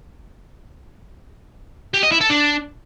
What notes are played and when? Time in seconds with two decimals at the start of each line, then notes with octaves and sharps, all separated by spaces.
1.94 G4
2.03 D#5
2.12 E4
2.21 A4
2.30 D4